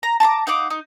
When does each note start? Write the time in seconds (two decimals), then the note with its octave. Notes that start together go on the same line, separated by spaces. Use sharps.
0.03 A#5
0.20 A5 A#5 C6 D6
0.47 D#4 F5 F#5 D6
0.70 D#4